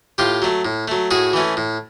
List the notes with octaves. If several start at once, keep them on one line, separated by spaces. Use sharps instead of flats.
A2 F4 G4
F#3 A3
A2
F#3 A3
A2 F#4 G#4
E3 A3 C#4
A2